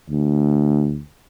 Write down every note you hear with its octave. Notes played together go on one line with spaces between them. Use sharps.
D2